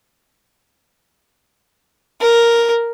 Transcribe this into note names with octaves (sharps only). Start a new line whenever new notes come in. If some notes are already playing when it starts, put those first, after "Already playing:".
A#4